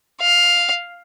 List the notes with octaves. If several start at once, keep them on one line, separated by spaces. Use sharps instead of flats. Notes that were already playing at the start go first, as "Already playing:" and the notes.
F5